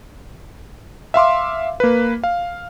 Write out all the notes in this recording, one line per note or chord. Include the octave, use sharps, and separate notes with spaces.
E5 F5 C6 D6
A#3 B4
F5